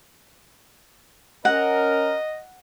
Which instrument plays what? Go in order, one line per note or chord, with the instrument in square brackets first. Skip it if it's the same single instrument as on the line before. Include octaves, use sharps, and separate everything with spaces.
[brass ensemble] C#4 A#4 [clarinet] D#5 [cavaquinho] F#5